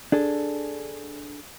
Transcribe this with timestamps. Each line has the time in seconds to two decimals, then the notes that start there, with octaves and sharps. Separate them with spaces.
0.12 D4 G#4 A4